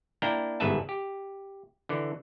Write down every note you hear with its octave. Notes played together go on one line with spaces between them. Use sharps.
A#3 D4 E4 G5 A#5
G1 E2 G#2 B4 E5 A5
G4
D3 E3